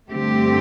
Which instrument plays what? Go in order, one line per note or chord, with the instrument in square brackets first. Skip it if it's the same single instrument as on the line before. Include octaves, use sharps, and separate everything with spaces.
[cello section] G2 D3 A3 C4 G4